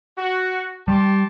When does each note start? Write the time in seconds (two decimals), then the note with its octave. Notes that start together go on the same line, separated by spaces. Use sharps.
0.18 F#4
0.88 G3 G4 A5 C6